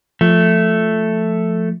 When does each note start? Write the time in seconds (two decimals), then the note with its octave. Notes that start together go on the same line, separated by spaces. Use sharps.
0.21 F3 A3